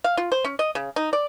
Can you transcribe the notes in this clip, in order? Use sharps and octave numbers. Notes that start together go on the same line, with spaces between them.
F5
F4
C5
C#4
D#5
C#3
D#4
D5